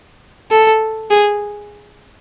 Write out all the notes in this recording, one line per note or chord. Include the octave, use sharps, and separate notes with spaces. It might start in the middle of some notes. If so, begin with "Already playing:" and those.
A4
G#4